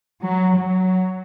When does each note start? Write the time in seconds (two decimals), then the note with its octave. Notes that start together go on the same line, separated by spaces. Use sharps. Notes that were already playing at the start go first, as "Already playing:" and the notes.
0.23 F#3
0.55 F#3